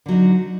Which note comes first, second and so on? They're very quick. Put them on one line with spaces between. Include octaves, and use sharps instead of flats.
D3 F#3 D#4